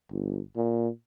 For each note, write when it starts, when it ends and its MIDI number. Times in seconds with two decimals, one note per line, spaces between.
0.12 0.40 31
0.56 0.88 46